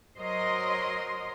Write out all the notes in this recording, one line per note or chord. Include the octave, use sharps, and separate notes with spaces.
F#3 A#4 C5 D#5 C6